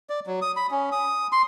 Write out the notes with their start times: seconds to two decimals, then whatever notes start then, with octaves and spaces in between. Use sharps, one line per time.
0.10 D5
0.27 F#3
0.42 D#6
0.57 B5
0.71 C#4
0.92 D#6
1.32 C6